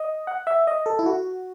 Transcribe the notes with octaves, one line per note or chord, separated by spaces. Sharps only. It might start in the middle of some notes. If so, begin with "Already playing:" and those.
Already playing: D#5
F#5
E5
D#5
A4
E4
F#4